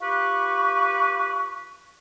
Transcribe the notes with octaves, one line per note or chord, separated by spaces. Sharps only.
F4 G4 B4 C#6